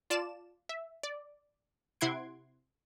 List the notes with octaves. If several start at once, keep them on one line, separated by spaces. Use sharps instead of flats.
F4 D5 A5 E7
E5
D5
C3 E4 F#5 C6 G#6 D7